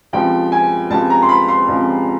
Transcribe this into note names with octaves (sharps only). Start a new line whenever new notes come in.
C#2 C3 F3 G5
G#5
C#2 C3 F3 A5
A#5
C6
B5
C6
C#2 C3 F3